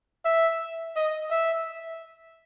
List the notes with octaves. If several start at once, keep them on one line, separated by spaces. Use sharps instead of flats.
E5
D#5
E5